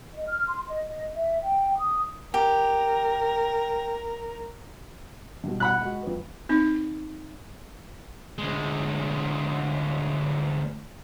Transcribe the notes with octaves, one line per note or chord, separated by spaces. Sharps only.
D#5
F6
C6
D#5
D#5
E5
G5
D#6
G4 A#4
G2 B2
F#5 B5 F#6
G#3 F#4
F2 B4
C4 D#4
D2 G#3